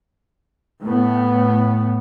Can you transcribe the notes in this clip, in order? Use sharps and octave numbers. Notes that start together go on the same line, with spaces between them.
A2 B3